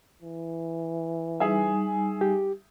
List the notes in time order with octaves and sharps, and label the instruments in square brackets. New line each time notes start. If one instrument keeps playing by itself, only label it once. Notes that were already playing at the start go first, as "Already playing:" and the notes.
[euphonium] E3
[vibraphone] G3 D#4 G#5 [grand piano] G#4 E5
[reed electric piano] G4